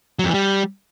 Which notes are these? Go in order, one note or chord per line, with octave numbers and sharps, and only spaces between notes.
F#3
F2
E3
G3